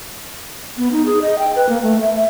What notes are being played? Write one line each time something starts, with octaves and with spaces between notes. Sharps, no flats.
B3
D#4
G#4
D#5
G5
B4
A#3
A3
E5
E5